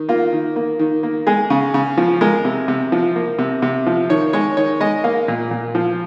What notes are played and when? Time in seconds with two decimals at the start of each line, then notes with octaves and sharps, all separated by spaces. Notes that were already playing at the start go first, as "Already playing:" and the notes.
Already playing: D#3
0.09 A#3 F4
0.32 D#3
0.56 A#3
0.79 D#3
1.03 A#3
1.27 G#3 G#4
1.50 C#3
1.74 C#3
1.97 F3
2.21 G#3 A#4
2.45 C3
2.68 C3
2.92 F3
3.15 A#3
3.39 C3
3.62 C3
3.86 F3
4.10 D#3 C#5
4.33 G#3 C#5
4.57 D#3 C#5
4.80 G#3 D#5
5.04 A#3 F5
5.28 A#2
5.51 A#2
5.75 F3